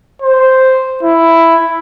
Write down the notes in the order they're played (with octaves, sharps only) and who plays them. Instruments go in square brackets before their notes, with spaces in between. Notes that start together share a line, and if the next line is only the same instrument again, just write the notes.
[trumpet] C5
E4